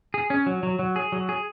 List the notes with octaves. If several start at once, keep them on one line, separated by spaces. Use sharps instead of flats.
G#4
C#4
F#3
F#3
F#3
G#4
F#3
G#4